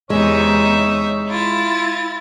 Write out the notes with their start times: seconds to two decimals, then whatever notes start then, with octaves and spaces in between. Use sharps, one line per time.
0.10 E2 C3 G#3 D#4 C#5 E5
1.29 E4 F4 A6